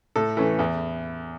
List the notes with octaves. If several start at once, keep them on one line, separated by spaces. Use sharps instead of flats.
A2 A4
E3 A3 C#4
E2